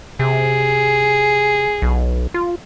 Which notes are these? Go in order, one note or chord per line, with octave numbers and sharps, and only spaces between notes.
C3 G#4
B1
F4